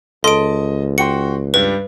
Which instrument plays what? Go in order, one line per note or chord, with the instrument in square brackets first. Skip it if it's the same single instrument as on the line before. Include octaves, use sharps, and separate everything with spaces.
[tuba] C#2 [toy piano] A4 [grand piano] D#5 A5 [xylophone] C6 D7
[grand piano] F#4 G5 C6 [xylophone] C#7
[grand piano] G2 G3 [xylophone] B4